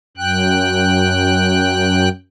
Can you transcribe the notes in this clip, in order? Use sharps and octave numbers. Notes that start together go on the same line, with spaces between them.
F#2 G5 F#6